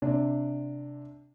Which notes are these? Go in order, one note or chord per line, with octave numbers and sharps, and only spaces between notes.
C3 D4